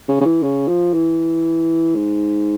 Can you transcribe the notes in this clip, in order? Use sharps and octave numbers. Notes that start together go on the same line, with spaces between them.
C#3
C#3
E3
C#3
F3
E3
G#2